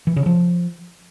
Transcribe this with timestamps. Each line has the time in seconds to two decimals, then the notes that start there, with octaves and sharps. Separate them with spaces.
0.07 E3
0.16 C#3
0.26 F3